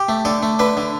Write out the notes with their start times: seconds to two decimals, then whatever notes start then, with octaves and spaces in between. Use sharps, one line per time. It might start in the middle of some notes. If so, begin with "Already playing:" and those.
Already playing: G4
0.09 A3
0.25 D3 A4
0.43 A3
0.59 D3 B4
0.77 D3